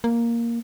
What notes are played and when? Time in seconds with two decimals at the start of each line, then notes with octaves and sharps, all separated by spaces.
0.04 A#3